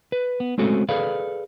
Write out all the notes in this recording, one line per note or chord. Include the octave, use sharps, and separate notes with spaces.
B4
B3
G#3 A3 C4 C#4 F#4 A4
G#4 A4 B4 D5 F5